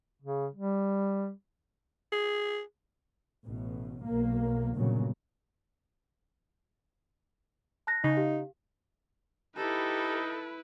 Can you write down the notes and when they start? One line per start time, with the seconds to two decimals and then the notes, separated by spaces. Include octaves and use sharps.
0.22 C#3
0.54 G3
2.12 G#4
3.46 A1 B2
4.04 B1 A#3
4.75 G1 A#2 C#3 F#3
7.87 A5 F#6 A#6
8.04 C#3 D#4
8.17 G4 F5
9.56 D#4 E4 G4 A4 B4